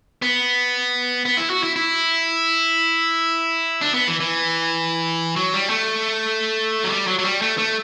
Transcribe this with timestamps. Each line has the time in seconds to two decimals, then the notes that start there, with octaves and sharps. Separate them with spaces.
0.22 B3
1.25 B3
1.37 E4
1.50 F#4
1.63 E4
1.76 E4
3.81 D4
3.94 B3
4.07 E3
4.20 E3
5.36 F#3
5.54 G3
5.70 A3
6.84 F#3
6.89 G3
7.07 F#3
7.19 F#3
7.24 G3
7.42 A3
7.58 A3